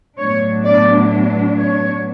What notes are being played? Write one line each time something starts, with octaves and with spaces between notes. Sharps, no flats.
A2 F#3 B3 D4 C#5
D5
C#5